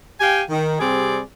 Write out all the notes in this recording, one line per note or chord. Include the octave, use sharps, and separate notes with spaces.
G4 F5 G5 G#5
D#3
C3 G3 C4 G#4 D5